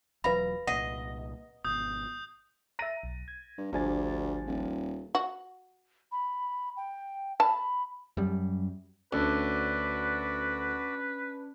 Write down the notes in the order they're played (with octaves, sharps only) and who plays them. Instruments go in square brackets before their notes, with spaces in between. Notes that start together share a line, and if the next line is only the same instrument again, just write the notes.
[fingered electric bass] E1 F#3 [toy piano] B4 F5 B5 [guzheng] A#5
[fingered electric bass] C2 A#2 [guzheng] D#5 [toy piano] F#5
[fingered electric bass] G#1 B2 [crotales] D#6 G6
[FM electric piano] E5 A#5 [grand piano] A6 A#6 D#7
[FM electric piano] B1
G#6
[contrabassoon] G2
[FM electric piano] G#1 G#5 A6 [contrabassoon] D2 [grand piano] F3 G3 D4
[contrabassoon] D#1
[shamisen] F#4
[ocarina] B5
G5
[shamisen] A5 [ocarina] B5
[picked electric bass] F#2 G3
[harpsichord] D2 [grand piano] C#4 D4 [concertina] F#4 D5 F#5 [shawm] B4